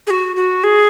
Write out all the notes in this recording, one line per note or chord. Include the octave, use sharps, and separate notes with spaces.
G#4
F#4
F#4
G#4